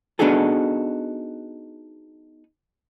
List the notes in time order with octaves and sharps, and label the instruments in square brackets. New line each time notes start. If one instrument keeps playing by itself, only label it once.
[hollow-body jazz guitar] B3 D4 D#4 F#4 G#4 A4